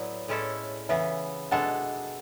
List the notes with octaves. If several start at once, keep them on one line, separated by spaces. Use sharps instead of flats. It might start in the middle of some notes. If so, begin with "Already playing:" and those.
Already playing: A2 F#3 B3 E4 D5
A2 G#3 C#4 E4 A4
C#3 E3 B3 E5
B2 G#3 D4 A4 F#5